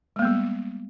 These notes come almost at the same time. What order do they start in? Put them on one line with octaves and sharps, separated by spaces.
G#3 A#3 B3 G3